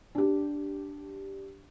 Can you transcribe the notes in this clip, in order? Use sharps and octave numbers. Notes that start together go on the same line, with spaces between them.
D4 G4